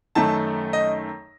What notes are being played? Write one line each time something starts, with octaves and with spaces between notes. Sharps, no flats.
F#2 D#3 A3 A5
D#5